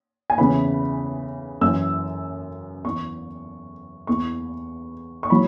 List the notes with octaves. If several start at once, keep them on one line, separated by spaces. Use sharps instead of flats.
G#5
E2 C#3 E3 B5
F#2 E3 E6
E2 E3 C#6
E2 E3 C#6
C#6
F#3 B5